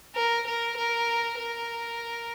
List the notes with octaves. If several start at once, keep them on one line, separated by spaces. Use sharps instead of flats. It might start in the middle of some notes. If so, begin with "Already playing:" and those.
A#4
A#4
A#4
A#4